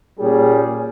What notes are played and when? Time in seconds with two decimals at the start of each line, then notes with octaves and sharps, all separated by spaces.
0.18 A#2 G3 C#4 G#4